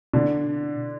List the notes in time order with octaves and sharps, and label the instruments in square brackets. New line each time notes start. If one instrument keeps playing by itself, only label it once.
[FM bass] B2 [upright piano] D3 D4